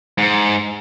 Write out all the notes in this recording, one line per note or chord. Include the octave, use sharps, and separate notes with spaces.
G#2